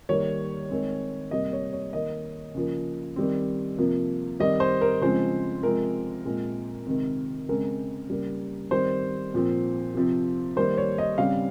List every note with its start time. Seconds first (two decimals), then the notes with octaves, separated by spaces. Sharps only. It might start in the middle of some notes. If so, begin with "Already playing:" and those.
0.09 D#3 G3 A#3 C#5
0.70 D#3 G#3 C4
1.31 C3 G3 A#3 D#5
1.53 C#5
1.73 C#5
1.93 D#3 A#3 D#5
2.55 C#3 F3 A#3
3.16 D#3 G3 C4
3.78 C3 F3 A#3
4.40 D#3 G3 C4 D#5
4.60 C5
4.81 A#4
5.01 C#3 F3 G#3 C4 C5
5.63 C3 F3 G#3 C4 A#4
6.25 A#2 G#3 C4
6.86 C3 D#3 G#3 C4
7.49 C#3 G#3 C4 A#4
8.10 C#3 G3 A#3
8.71 D#3 G3 C4 C5
9.34 A#2 F3 C4
9.94 C3 F3 C4
10.56 D#3 G3 A#3 C5
10.78 C#5
10.98 D#5
11.18 C#3 G3 C4 F5